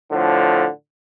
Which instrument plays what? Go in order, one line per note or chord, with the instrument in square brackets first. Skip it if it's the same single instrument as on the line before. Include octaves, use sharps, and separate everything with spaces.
[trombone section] A2 D3 F3